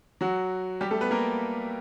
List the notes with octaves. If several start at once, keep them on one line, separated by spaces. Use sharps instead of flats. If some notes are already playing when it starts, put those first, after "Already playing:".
F#3 F#4
G3 G4
A3 A4
B3 B4
A#3 A#4